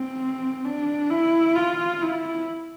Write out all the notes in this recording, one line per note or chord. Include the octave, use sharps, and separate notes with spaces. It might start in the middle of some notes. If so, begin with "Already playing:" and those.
Already playing: C4
D4
E4
F4
E4